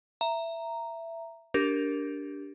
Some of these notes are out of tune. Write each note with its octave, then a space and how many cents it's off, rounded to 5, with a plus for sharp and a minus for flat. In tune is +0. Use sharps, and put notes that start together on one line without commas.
E5 +15 A#5 -5
D4 -15 G4 +0 A#4 +0